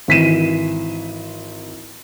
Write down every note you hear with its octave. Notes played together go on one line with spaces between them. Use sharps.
G#1 E3 B6 C7 D#7 E7